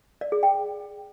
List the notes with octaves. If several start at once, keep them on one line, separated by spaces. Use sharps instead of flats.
D5
G#4
G5